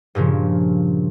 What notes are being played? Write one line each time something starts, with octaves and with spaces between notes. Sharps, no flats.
G2 A#2 C#3 F3